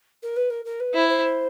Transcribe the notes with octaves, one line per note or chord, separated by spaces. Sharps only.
A#4
B4
A#4
A#4
B4
E4 C5
C5